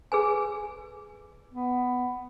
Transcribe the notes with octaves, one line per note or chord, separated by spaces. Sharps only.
G#4 B4 G#5
B3